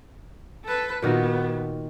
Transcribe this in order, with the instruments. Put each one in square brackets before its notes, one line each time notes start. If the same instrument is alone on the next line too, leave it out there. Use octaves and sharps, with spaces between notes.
[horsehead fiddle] A4 B4
[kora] A#2 D#3 F#4 [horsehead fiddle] B3